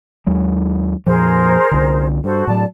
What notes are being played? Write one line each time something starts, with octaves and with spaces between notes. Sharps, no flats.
D#2 F#3 G#3
F2 A#2 F3 G#4 A#4 C5
C2 D3
G2 F#4 A4 C5
A2 F#3 D5 A5